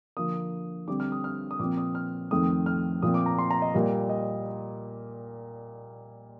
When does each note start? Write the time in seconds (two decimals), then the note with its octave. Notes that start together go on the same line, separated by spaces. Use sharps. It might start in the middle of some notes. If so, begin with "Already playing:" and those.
0.17 D3 F3 A#3 D#6
0.88 D3 G3 C4 D6
1.00 F6
1.12 D#6
1.24 F6
1.51 D#6
1.59 A#2 F3 C4 D6
1.78 D#6
1.95 F6
2.31 F2 D#3 A3 C4 D#6
2.66 F6
3.02 A#2 F3 C4 D#6
3.14 D6
3.26 A#5
3.38 C6
3.50 A#5
3.62 D#5
3.74 A#2 G3 A#3
4.09 D#5